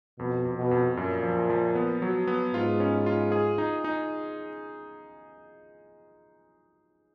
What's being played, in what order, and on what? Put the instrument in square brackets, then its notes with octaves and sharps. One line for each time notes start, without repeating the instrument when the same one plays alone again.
[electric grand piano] F2 [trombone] B2
[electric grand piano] F2
[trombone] B2
[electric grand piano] F2
[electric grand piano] F#2 [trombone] A#2
[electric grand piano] F3
F3
B3
F#3
B3
[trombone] G#2 [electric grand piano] F4
[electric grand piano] C#4
F4
G#4
D#4
D#4